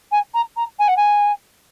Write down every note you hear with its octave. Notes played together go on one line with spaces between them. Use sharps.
G#5
A#5
A#5
G#5
F#5
G#5